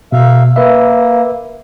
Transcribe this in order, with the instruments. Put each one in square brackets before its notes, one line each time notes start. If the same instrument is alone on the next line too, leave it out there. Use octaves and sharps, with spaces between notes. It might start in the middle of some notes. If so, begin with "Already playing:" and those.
[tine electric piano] B2 [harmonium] E5 F5
[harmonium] A#3 [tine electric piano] B4 E5